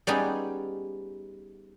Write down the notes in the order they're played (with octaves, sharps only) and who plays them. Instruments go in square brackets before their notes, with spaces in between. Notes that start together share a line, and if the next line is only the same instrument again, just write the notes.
[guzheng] G3 B3 C#4 D#4 G4 G#4